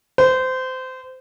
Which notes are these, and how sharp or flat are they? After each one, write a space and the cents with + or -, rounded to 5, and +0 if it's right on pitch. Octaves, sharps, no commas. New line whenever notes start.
C5 -25